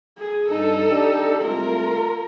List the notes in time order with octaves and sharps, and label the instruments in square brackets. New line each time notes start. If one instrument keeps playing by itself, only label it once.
[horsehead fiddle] G#4
[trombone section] G2 [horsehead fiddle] D#4 A4
[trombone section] D4 G4
[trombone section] C2 G#3 A3 [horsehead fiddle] F4 A#4